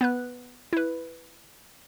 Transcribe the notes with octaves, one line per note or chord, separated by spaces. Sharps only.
B3 B4 F#6
E4 B4